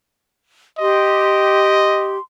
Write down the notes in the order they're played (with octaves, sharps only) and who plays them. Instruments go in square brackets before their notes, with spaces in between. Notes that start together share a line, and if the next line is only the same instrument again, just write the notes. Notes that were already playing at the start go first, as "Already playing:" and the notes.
[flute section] G4 C6 [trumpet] D#5